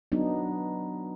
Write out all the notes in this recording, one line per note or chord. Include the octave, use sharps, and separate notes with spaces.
F#3 B3 D4 D#4